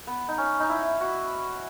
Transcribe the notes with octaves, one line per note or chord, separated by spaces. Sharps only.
B3
D#4
C#4
D#4
E4
F#4